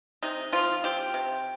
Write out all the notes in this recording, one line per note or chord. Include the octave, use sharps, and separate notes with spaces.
C3 D#4
F3 F4
C4 G4
C3